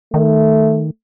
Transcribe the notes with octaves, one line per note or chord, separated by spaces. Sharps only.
D#3 A3